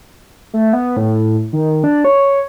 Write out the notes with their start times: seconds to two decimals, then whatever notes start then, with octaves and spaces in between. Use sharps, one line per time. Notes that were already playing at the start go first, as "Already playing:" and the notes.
0.54 A3
0.73 B3
0.97 A2
1.53 D#3
1.84 D4
2.05 C#5